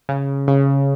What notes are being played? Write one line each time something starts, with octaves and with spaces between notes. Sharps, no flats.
C#3
C#3